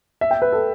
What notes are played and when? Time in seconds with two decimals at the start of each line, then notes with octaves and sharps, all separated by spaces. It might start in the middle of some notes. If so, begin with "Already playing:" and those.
0.21 E5
0.31 G5
0.42 B4
0.52 A4